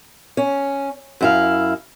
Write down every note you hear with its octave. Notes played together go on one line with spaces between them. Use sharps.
C#4
F#2 E4 F5